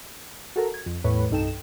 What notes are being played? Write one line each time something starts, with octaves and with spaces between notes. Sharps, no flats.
F#4 A4 A#4
G#6
F2
E2 A2 B4 C#5
C2 G2 D#4 A4 G5 E7